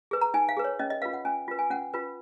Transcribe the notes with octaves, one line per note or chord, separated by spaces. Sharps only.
G#4 B4
A#5
D#4 G#5
F5
G#4 B4
C#5
C#4 D#5
D#5
F4 B4 F5
F#5
C#4 G#5
F4 B4
G#5
C#4 F#5
F4 B4